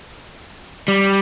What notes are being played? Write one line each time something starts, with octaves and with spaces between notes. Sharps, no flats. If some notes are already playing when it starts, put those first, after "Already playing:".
G3